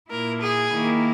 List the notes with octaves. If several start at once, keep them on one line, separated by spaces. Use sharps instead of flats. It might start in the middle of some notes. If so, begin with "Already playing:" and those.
A#2 A#3 E4 A#4
G#4
D#3 A#3 E4